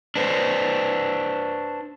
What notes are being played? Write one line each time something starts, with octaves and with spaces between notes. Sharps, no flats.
D4 B4 C5